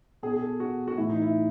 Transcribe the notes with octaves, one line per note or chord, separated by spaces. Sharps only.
B2 G#4
G#4
A4
F#4
F#4
A2 E3 E4
D#4
E4